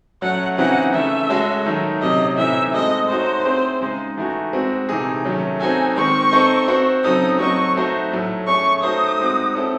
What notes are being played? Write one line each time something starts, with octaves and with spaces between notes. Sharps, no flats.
F#3 A3 C#4 F#5
C#3 E3 C4 D#4 F#4 F#5
C#3 E3 A3 E5
G#3 C#4 F#4 A4 C#5
D#3 F#3 A3 D#4
C3 F#3 C#4 D#5
A2 E3 C4 D#4 E5
G#3 C4 F#4 A4 D#5
A3 D#4 F#4 C5 C#5
C4 E4 G#4
C#3 G#3 D#4 G#4
E3 A3 D#4 F#4
G#3 C4 F#4
C3 E3 A3 D#4 G#4
D#3 F#3 A3 C#4 G#4
C4 D#4 F#4 A4 G#5
D#3 G#3 C4 C#6
C4 D#4 A4 C5 D#5
C4 F#4 C5
C#3 F#3 C4 D#4 A4 D#6
F#3 C4 F#4 A4 D#5 C#6
A3 D#4 F#4 C5
A2 F#3 A3
A3 C#4 G#4 C#5 C#6
A3 D#4 F#4 A4 C5 D#6
G#3 C4 D#4 F#4
C4 E4 A4 C#5